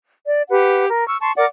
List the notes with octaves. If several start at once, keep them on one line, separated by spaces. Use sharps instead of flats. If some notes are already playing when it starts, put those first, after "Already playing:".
D5
G4 B4 F#5
A#4
C#6 E6 F6
A5 C6 C#6
A#4 D5 F#5 D6